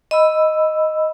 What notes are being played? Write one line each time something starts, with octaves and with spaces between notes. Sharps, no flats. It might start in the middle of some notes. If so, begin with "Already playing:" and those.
D#5 B5 E6